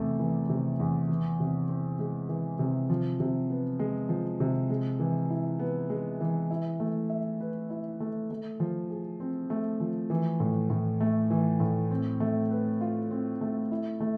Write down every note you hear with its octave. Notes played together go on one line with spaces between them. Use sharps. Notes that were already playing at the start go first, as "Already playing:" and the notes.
Already playing: E2 C3 A3
E3
C3
E2
E3
C3
C4
G#3
E3
C3
F3
C3
B3
G#3
F3
C3
G#3
E3
E4
B3
G#3
E3
E4
A3
E5
B4
E4
A3
A3
F3
G#4
C4
A3
F3
E3
A2
A2
A3
E3
A2
C4
A3
B4
F4
C4
A3
E4
A3